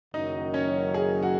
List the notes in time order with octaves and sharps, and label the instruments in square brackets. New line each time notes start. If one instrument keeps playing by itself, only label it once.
[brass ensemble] F#1 F#2 D#3 F#3 [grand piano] D#4 D#5
[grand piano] C#4 C#5
G#4
F#4